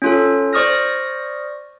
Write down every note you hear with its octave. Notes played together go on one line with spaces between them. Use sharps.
C#4 F4 A4
C5 D5 C#6 D#6 F6 A#6